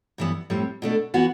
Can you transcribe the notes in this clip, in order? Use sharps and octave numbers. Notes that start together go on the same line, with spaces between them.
G2 E3 B3
A2 G3 C4
B2 A3 D4
E3 B3 F#4